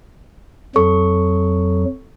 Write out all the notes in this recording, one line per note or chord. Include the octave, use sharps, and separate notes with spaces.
F2 F#3 A4 C#6